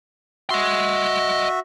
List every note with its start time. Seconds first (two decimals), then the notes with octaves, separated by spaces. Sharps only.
0.50 F#4 D#5 E5 C6